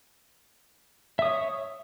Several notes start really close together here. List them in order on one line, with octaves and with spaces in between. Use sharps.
E5 D#6 C#5